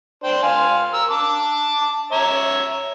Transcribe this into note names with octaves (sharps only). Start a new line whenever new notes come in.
D4 C5 G5
F5 G#5 C6
A#4 E6
A5 D6
C#5 E5 A#5